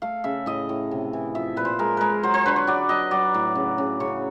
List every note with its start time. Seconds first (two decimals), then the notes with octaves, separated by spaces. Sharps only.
0.02 A3 F5
0.24 C#3 E5
0.46 A2 D#5
0.69 A2
0.91 C3
1.13 E3
1.35 F3 E5
1.57 A#2 B4
1.65 C5
1.79 G#3 A#4
1.97 G#3 A#4 B4
2.23 F#3 C5
2.34 C5
2.46 D3 B4
2.56 C#5
2.67 F#3 D5
2.89 F#3 D#5
3.11 F#3 D5
3.34 A2
3.55 C#3
3.78 C#3
4.00 C#3 C#5